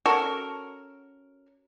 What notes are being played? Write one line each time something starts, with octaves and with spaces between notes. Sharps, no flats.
C#4 F#4 A4 A#4